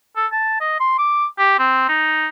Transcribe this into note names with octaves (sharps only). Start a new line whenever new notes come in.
A4
A5
D#5
C6
D6
G4
C4
D#4